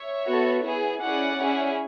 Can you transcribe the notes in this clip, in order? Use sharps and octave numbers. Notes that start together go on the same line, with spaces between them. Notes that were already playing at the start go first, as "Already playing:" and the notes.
Already playing: C#5 E5
B3 F#4 A4
B3 E4 G#4
C#4 E4 G#4 D5 F#5
C#4 E4 G#4